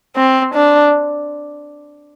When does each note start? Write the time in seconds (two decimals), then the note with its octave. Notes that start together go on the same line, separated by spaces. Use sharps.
0.16 C4
0.54 D4